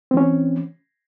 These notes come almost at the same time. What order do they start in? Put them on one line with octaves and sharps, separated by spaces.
C4 E3 C#4